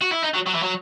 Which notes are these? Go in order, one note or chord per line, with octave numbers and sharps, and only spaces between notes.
F#4
E4
D#4
F#3
F#3
E3
F#3